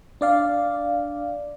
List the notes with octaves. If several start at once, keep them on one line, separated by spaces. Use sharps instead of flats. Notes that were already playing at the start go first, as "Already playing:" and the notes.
D4 D5 F5